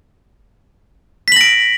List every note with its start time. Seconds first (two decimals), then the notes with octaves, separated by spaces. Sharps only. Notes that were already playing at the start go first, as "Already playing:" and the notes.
1.28 B6
1.32 F#7
1.36 A#6
1.41 D7